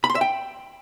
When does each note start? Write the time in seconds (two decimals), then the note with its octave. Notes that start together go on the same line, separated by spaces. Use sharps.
0.04 B5
0.10 C6
0.15 E5
0.21 G5